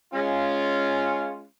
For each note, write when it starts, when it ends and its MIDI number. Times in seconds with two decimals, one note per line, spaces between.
0.14 1.45 56
0.14 1.45 61
0.14 1.45 65